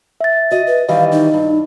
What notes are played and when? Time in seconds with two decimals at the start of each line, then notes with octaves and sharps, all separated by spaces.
0.21 E5 A6
0.51 F#4 D#5
0.67 B4
0.89 D#3 E3 G3 D#5 F5
1.12 D#4
1.34 G2